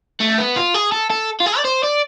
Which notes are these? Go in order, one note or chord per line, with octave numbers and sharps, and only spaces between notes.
A3
B3
F4
G#4
A4
A4
F4
G#4
D5
C5
D5